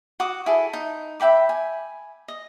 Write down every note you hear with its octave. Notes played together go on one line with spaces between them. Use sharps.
F#4 D6 D#6
E4 G#4 A4
D#4
E5 G5 B5 D6
G#5
D#5